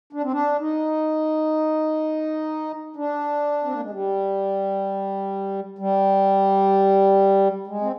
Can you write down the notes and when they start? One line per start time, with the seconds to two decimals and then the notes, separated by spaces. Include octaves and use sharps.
0.13 D4
0.23 C4
0.31 D4
0.60 D#4
2.96 D4
3.64 C4
3.72 A#3
3.82 G#3
3.90 G3
5.78 G3
7.67 G#3
7.81 C4